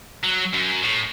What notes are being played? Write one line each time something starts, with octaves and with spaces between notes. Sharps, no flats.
F#3
F#2
A2